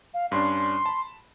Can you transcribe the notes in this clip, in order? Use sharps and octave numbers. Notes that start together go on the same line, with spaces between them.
F5
G2 C#4 D4 C6
A5 B5